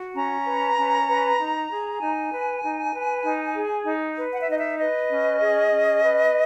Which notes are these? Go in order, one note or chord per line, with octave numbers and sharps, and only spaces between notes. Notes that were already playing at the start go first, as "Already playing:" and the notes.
Already playing: F#4
C#4 A#5
B4
C#4
B4
D#4
G#4
D#4 G#5
B4
D#4
B4
D#4
G#4
D#4
B4
F#5
E5
D#4 D#5
E5
B4 D#5
C#4
G#4
C#4
B4